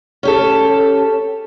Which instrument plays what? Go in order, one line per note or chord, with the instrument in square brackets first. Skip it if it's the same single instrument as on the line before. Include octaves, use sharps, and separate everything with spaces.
[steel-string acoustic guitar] C#4 G4 A4